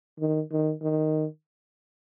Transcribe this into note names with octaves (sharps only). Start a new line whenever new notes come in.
D#3
D#3
D#3